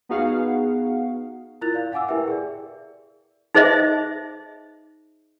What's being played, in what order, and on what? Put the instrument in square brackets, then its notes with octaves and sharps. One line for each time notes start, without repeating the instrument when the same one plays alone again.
[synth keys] B3 D#4 F#4 G#4 F5 F#5
[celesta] E4 F4 A#4 F#6 A6 F7
D5 F5
F5 F#5 G#5 D6 E6
E4 G4 A#4 B4 E5 G5
G#4 D5
[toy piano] D#4 G#4 C5 D#5 E5